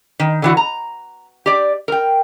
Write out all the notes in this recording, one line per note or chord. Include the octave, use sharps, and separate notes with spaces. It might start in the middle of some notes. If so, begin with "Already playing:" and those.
D#3
D3 E3 F#4
A#5
G4 D5
A#4 G5